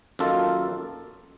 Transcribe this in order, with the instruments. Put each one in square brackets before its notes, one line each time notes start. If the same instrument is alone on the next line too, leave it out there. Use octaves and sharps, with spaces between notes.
[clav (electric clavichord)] F#2 D#3 A#3 F4 A4